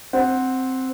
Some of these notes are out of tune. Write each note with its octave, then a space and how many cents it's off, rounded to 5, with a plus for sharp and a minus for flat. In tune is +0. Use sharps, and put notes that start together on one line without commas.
C4 +0 F#5 +0